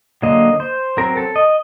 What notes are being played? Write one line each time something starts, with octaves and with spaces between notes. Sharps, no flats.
D3 F#3 A#3 D#5
C5
F#3 C4 A#4
A4
D#5